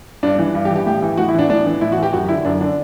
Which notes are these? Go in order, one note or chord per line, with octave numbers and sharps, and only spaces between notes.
G2 D4
E3
G2
G4
E3
G4
A2 G4
E3
A2 F#4
E4
E3 D4
A2 D4
E3
A2 E4
F#4
E3
G4
F#2 F#4
D3 E4
F#2 D4
D3 D4